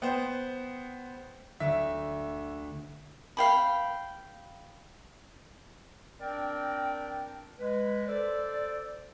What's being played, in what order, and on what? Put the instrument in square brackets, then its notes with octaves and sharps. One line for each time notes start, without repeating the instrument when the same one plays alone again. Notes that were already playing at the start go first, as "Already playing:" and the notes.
[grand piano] B3 C5 [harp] G5
[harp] D2 [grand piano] E5
[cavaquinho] F5 G5 B5
[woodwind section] C4 D4 A#4 D5 G5
G#3 B4
A4 C5 D5